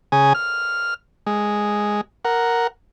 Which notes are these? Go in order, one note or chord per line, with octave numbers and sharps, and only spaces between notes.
C#3 G#4 G#5
F6
G#3
A#4 F#5